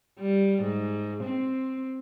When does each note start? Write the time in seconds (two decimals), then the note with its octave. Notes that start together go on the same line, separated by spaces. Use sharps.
0.19 G3
0.62 G#2
1.24 C4